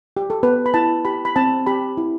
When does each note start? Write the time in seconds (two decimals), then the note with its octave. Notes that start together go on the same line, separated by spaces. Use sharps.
0.17 G4
0.30 A4
0.43 B3 B4
0.66 B5
0.74 E4 A5
1.05 G4 B5
1.25 B5
1.36 C4 A5
1.66 G4 B5
1.97 E4